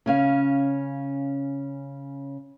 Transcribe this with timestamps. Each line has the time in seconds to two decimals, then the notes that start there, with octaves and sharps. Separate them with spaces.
0.06 C#3 C#4 F5